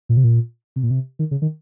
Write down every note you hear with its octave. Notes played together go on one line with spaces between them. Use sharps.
A#2
C3
A#2
C3
A#2
C3
D#3
C#3
D#3